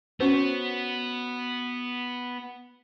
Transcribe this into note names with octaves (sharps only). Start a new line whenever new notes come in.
B3 C#4 F#4 C5